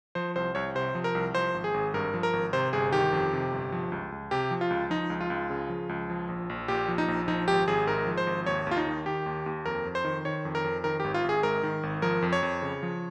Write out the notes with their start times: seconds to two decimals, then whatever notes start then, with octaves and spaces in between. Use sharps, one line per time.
0.15 F3 C5
0.36 C2 C5
0.55 C2 C#5
0.75 C3 C5
0.95 F3
1.04 A#4
1.15 C2
1.34 F3 C5
1.54 G#1
1.64 G#4
1.74 G#1
1.94 G2 A#4
2.14 F3
2.23 A#4
2.33 G#1
2.53 C3 C5
2.73 G1 G#4
2.93 D#3 G4
3.13 F2
3.33 C3
3.52 G1
3.72 F3
3.92 C#2
4.12 C#2
4.31 C3 G4
4.51 F3
4.61 F4
4.70 C#2
4.90 F3 D#4
5.10 C#2
5.21 F4
5.30 C#2
5.50 C#3
5.70 F3
5.89 C#2
6.10 F3
6.29 A#1
6.50 A#1
6.68 A#2 G4
6.88 F3
6.98 D#4
7.08 A#1
7.28 F3 D#4
7.48 G#1 G4
7.67 G#1 G#4
7.87 G#2 A#4
8.07 F3
8.18 C5
8.27 G#1
8.46 D#2 C#5
8.67 D#2 F4
8.77 D#4
8.87 D#3
9.06 D#3 G4
9.26 D#2
9.46 D#2
9.66 F2 A#4
9.85 F2
9.95 C5
10.04 D#3
10.25 D#3 C#5
10.45 F2
10.55 A#4
10.64 F2
10.84 D#3 A#4
11.00 G#1 G4
11.14 F4
11.24 G#1 G#4
11.43 G#2 A#4
11.63 D#3
11.83 G#1
12.02 F3 A#4
12.22 F2
12.33 C#5
12.43 F2
12.62 C#3
12.83 F3